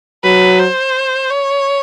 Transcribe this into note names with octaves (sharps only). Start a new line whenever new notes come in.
F#3 B4
C5
C#5